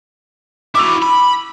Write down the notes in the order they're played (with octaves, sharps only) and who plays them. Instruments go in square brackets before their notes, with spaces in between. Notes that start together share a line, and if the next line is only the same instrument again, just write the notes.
[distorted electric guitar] E4 F#4 [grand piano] D6 E6 F7
[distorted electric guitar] B5